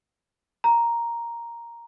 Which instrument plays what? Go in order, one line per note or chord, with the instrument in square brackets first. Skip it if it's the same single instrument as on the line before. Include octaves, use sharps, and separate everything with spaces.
[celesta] A#5